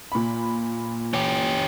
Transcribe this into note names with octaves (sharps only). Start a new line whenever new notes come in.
A#2 B5
C#4 G4